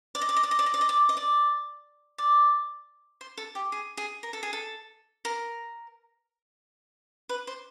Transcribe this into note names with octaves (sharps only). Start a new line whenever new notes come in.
D5
D#5
D5
D#5
D5
D#5
D5
D#5
D5
D#5
D5
D#5
D5
D5
C5
A4
G4
G#4
G#4
A#4
A4
G#4
A4
A#4
B4
C5